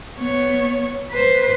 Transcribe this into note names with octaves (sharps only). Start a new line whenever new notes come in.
B3 C#5
B4 C5